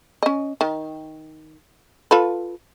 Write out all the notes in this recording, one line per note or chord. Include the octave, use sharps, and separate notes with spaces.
C#4 D#5
D#3
F4 A4 B4